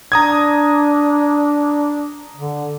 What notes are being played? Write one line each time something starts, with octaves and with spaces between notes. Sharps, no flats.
D4 A#5 D#6 G#6
D3